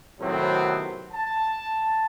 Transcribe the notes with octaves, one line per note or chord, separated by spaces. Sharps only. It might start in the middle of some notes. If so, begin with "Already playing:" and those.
A2 C3 D#3 F#3 B3 C4
A5